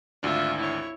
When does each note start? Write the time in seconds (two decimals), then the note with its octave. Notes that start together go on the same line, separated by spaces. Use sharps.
0.23 G#1 D2 D4 F4 E5
0.58 E4 C#5